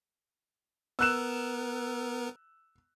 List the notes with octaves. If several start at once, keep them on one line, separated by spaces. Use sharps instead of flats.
B3 A#4 E6 F#6 E7